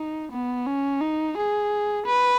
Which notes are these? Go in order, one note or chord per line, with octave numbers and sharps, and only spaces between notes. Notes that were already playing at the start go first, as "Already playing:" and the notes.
Already playing: D#4
B3
C#4
D#4
G#4
B4